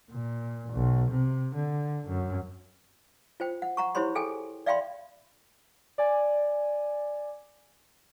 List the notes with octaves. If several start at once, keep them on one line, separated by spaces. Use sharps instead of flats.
A#2
B1
C3
D3
F#2
F4 C5 G5
F#5
F#5 A#5 C#6
E4 G4 C5 C#5 B5 C6
G#4 A4 G5 G#5
D5 E5 F5 G5 B5 C6
D5 G#5